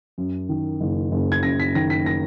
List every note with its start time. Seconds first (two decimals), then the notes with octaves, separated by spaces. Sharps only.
0.18 F#2
0.49 D#3
0.81 F#1
1.12 F#1
1.32 G#6
1.43 F#2 A#6
1.60 B6
1.75 D#3 A#6
1.90 B6
2.06 A#6